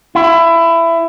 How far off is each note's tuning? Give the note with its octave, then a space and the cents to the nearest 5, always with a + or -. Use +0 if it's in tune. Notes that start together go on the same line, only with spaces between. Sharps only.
E4 +20